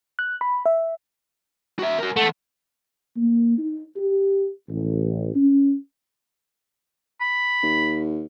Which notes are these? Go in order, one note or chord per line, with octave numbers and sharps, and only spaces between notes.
F#6
B5
E5
F#4 E5
F#4 A#4
E3 A3 F#5
A#3
D#4
G4
A1
C#4
B5
D#2